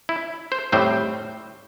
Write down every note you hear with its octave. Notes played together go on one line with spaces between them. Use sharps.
E4
C5
A2 G3 C4 C5